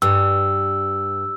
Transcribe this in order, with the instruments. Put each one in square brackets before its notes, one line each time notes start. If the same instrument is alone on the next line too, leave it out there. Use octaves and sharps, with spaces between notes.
[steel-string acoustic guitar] G2 [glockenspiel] E6